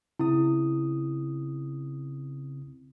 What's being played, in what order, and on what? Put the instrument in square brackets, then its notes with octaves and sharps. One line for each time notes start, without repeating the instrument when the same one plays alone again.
[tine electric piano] C#3 C4 D#6 [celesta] E4